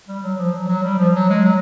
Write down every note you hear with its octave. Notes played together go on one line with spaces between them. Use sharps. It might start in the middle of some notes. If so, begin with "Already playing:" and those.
G3
F#3
F3
F#3
F#3
G3
F3
F#3
G#3
F#3